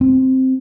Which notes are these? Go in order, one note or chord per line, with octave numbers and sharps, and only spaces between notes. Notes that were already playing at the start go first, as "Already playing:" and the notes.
C4